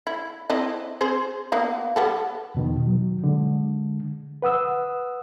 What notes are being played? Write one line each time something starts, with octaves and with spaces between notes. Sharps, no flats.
E4
C4 E4 D#5
C4 G#4 C5
A#3 B3 F5
G3 B3 A4
E2 B2 D#3
F#3
D3 G#3
B4 F#5 D#6 E6